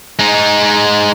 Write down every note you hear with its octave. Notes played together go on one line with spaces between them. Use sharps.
G#3 D#4